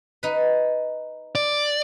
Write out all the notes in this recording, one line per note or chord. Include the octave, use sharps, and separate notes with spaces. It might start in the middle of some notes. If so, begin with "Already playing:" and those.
D#4 B4
D5